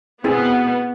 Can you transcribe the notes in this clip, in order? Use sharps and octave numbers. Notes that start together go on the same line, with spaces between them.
B2 B3 C4 E4 G#4